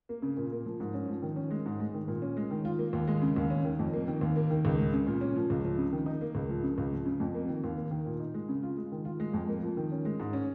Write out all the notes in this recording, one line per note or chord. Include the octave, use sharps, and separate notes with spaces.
A#3
C#3
A#2
A#3
F3
G#2
C#4
F3
D#3
C#4
G#3
G#2
G#3
D#3
A#2
C#4
G#3
D#3
F4
A#3
D#2
G#3
C#3
D#2
C#4
D#3
F2
A#3
D#3
D#2
A#3
D#3
C#2
G#3
C#3
A#2
C#4
F3
C#2
F3
C#3
D#3
D#4
A#3
C#2
F3
C#3
C#2
F3
C#3
F2
A#3
D#3
D#2
A#3
D#3
A#2
D#4
G#3
C#3
F4
G#3
D#3
F4
G#3
F2
A#3
F3
D#3
C#4
G#3
G#2
C#4